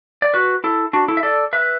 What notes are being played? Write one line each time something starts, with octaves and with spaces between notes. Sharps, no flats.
D5
F#4 B4
E4 A4
D4 F#4
E4 A4
E5
A4 D5
B4 E5